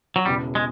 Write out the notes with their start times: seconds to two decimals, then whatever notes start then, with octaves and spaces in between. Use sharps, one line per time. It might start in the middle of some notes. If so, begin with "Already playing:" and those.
0.16 F#3
0.25 E1 E2 C#3 G3
0.55 G#3